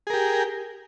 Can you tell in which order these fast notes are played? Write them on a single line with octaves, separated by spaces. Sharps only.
G#4 A#4 G4